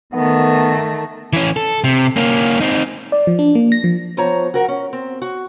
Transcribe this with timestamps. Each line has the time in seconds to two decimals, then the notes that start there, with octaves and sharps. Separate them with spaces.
0.12 D#3 A3 B3
1.33 E3 C#4
1.57 A4
1.84 C3
2.16 A#3 C#4
2.61 C4 D#4
3.12 D5
3.27 F3
3.39 D4
3.55 A#3
3.72 A#6
3.84 F3
4.17 F3 B3 C5 C#5 A#5
4.54 F#4 A#4 F#5
4.68 C#4
4.93 C4
5.22 F#4